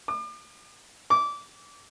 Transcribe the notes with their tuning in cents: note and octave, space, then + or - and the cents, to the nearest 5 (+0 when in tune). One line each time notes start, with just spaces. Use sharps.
D6 +40
D6 -20